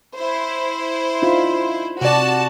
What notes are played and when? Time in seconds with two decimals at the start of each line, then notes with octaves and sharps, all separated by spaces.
0.15 E4 C5
1.22 D4 D#4 F4
2.01 C3 F#4 D5 A5